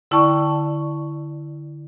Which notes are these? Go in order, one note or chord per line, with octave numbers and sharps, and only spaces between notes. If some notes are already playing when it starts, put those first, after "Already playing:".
D3 E4 D5 G5 A5 C#6